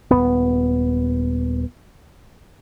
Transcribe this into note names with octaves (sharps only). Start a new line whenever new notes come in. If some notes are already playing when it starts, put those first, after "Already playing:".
D#1 E2 B3